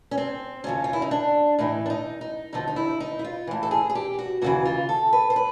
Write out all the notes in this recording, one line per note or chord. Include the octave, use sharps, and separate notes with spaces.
C#4
C4
D#2 C#3 F3 C#4
F4
E4
D#4
D4
A2 E3 D#4
D4
D#4
D#4
D#2 D3 F3 D#4
D#4
E4
D#4
E4
F4
A2 E3
A4
G#4
G#4
G4
F#4
D#2 C#3 E3 F#4
F4
A4
B4
C5
B4